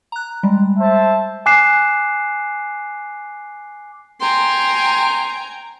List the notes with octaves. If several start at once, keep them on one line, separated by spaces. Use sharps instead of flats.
A#5 F#6
G3 G#3
C5 E5 A5
G#5 D6 F#6 C7 E7
G5 G#5 A#5 C6